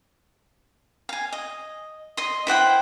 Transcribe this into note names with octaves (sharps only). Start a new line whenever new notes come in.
F5 G#5
D#5
D#5 C6
E4 C5 F#5 G5